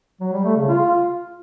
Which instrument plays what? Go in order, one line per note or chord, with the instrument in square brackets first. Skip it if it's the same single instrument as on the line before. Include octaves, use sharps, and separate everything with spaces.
[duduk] F#3
G3
A3
C#3
F4